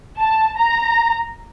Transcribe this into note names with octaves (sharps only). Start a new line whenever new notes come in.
A5
A#5